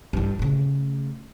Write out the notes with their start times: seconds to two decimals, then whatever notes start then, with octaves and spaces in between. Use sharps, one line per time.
0.13 G2 E3
0.39 C#3 A3